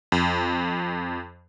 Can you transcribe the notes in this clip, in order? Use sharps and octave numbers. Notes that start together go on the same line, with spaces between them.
F2